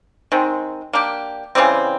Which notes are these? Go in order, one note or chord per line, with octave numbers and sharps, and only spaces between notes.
D#3 G#3 C4
A#3 D4 G4
C#3 E3 G3 C4